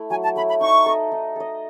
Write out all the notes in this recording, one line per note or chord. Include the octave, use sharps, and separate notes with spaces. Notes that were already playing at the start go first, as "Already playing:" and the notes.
Already playing: A3 E4
F#3 G#5
A5
A3 E4 B5
B5
D#4 C#6
A4 D#5
D#4
A4 D#5